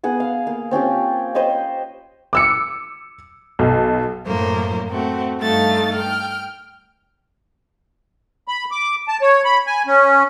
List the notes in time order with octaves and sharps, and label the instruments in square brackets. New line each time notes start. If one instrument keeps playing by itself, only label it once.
[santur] B3 G#4 F#5
F5
A#3
C4 C#4 F4 G4
C5 C#5 D#5 B5
[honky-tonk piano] D6 E6 C#7
B1
[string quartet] F#2 A2 A#3 C5
A3 C4 F#4
G2 A3 D#4 A4 F5 A6
G5 F6
[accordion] B5
D6
A5
C#5
B5
G#5
C#4